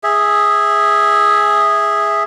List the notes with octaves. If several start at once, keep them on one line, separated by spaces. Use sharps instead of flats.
G#4 E5